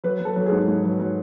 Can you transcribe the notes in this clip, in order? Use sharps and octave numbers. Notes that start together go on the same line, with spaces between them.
F#3 B4
F#3
A4
F#3
G#4
G#2
G#2
F#3
F#3